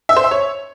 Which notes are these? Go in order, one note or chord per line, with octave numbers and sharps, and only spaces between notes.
E5
C5
E5
C#5